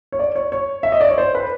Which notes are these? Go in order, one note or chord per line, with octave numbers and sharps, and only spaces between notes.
C#5
D5
C#5
C#5
E5
D#5
D5
C#5
C5
B4